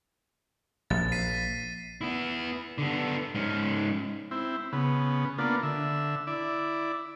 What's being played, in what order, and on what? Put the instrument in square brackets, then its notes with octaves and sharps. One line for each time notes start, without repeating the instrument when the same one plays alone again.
[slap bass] A#1 [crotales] A6
[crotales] B6 C7 D#7
[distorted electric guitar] B3 E4
D3 B3
G#2 C#4
[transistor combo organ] C4 E4
C#3 B3
A#3 B3 D4 F4
D3 E5
E4 D5